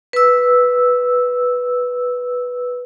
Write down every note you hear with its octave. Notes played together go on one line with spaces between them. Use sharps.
B4 E6